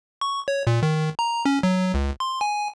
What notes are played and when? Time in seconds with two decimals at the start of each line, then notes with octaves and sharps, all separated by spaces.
0.21 C#6
0.48 C#5
0.67 A#2
0.83 D#3
1.19 A#5
1.45 C#4
1.63 F#3
1.94 C#2
2.20 C6
2.41 G#5